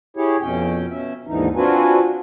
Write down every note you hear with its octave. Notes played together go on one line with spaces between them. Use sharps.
E4 G4 G#4 C#5
F2 B2 C#4 G5
B2 C#4 E5
D#2 G#2 D3 E3 D#4
C4 D4 F4 F#4 B4 G#5